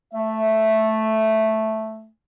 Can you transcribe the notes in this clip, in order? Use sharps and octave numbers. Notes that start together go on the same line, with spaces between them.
A3 E5